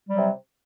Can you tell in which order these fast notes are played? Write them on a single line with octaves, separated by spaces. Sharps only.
G3 F#3 C3